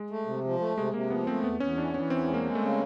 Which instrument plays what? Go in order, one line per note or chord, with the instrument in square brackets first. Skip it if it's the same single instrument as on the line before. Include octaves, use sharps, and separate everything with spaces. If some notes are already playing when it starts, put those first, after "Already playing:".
Already playing: [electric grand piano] G#3
[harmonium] A3
C3
F3
A3
[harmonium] C3 [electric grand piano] G#3
[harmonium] C3 [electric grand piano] A#3
[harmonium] F3 [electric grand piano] B3
[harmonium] A3 [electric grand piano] C4
[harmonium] E2 [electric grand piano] B3
[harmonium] E2 [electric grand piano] C#4
[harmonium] E3 [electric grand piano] D4
[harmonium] E3 [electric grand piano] C#4
[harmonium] E2 [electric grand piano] C4
[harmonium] G#3
[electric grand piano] A#3
[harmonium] G#3
[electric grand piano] A3
[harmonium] C#3